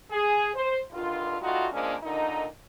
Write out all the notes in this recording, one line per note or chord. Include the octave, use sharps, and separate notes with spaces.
G#4
C5
G2 D3 D#3 F4
G3 A3 D#4 F4 F#4
A#2 F3 G#3 A#3 C#4 D4
A#2 D3 D#3 D#4